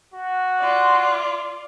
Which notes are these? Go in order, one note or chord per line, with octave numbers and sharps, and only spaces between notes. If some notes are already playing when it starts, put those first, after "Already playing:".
F#4
F4 D5